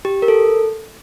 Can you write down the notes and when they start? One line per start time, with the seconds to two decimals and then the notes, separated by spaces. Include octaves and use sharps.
0.05 G4
0.22 A#4
0.28 A4